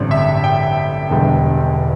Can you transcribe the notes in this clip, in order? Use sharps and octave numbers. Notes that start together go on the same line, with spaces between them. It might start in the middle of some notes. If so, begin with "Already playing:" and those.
Already playing: A1 G2 D3 G3 C4 D5
E5
G5
E1 E2 D3 G3 D4